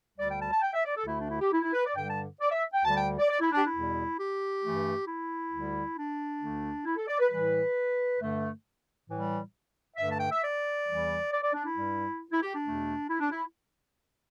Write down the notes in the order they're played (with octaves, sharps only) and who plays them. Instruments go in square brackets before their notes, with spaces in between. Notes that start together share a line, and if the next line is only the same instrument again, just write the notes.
[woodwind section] D2 D3 G3 D5
G5
A5
A5
G5
E5
D5
A4
D2 D3 A3 E4
D4
E4
G4
E4
E4
B4
D5
G2 D3 G3 G5
A5
D5
E5
G5
D2 D3 G3 A5
G5
D5
D5
E4
D4
G4
E4
E2 B2 G3
G4
G2 E3 A3
E4
D2 D3 G3
D4
D2 D3 A3
E4
A4
D5
B4
A2 E3 G3 B4
G2 D3 A3
A2 E3 G3
G2 D3 A3 E5
A5
G5
E5
D5
E2 E3 G3
D5
D5
D4
E4
G2 G3
E4
G4
D4
E2 B2 A3
E4
D4
E4